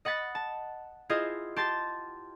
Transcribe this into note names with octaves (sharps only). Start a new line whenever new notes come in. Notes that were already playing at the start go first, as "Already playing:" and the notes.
D#5 F#5 B5 A6 B6
A5
E4 F4 G#4 C5 D#5
G4 A5 C6 A6